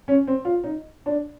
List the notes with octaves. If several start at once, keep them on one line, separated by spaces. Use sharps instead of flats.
C#4
C4
F4
D#4
D4